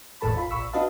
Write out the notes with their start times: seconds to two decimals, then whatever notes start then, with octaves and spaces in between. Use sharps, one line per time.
0.21 G#1 E2 A2 A4 A5 B5
0.35 G#1 F4 B5
0.50 A#1 B5 C#6 E6 B6
0.73 D4 F#4 B4 D#5 F5 A5